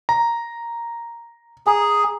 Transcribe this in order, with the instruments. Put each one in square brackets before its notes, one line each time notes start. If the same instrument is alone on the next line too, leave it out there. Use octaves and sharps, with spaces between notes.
[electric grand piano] A#5
[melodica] G#4 [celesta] G#5 A#5